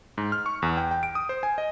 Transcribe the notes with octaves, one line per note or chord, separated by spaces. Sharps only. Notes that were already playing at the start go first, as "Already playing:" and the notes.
G#2
F6
C#6
E2
G5
G5
D7
D#6
C5
G#5
D#5